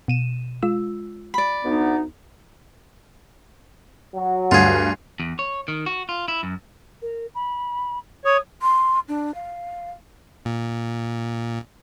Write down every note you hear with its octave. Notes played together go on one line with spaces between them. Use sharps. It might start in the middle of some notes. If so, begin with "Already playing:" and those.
B2 D#7 E7
G#3 F4 E6
D5 B5
D2 B3 D#4
F#3
D2 G2 F4 G#4
E2
C#5
D#3
F#4
F4
E4
F#2
A#4
B5
C#5 D#6
C6
D4
F5
A#2